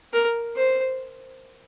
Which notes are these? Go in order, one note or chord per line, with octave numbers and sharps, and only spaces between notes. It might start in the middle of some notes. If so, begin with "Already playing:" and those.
A#4
C5